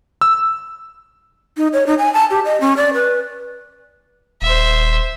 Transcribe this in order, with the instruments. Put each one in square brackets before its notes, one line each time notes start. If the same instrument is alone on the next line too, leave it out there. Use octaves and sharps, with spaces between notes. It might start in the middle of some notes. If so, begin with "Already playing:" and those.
[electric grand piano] E6
[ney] D#4
C#5
D#4
G#5
A5
G4
D#5
C#4
D5
B4
[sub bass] D#1 [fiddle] C5 E5